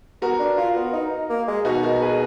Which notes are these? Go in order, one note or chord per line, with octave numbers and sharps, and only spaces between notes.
B3 F#4 A#4
D4
F4
B3
D#4
A#3
G#3
B2 D#4 F#4
F#4 A#4
G#4 B4